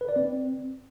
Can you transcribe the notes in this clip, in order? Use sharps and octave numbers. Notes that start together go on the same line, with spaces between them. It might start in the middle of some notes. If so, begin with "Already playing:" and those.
B4
D5
C4